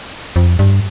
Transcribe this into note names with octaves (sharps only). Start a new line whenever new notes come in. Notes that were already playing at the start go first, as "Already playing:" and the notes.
F2
G2